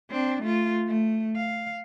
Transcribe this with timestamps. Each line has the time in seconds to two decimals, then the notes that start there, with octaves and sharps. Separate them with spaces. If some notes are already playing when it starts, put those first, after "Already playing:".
0.11 C4 D4
0.42 A3 F4
0.87 A3
1.36 F5